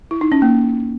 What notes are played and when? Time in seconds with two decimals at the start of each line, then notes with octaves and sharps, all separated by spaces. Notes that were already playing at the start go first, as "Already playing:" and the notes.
0.11 E4
0.21 D#4
0.32 C#4
0.42 A#3